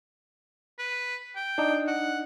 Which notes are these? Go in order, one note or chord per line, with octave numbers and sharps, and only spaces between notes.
B4
G5
D4 D#4
F#5